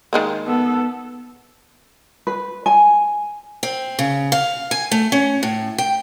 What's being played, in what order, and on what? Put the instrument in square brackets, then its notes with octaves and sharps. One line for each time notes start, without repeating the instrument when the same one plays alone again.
[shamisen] D#3 G#3 A#3
[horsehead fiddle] B3 A4
[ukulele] B4
G#5
[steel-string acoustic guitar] C4
C#3
F5
G#5
A3
C#4
A2
G5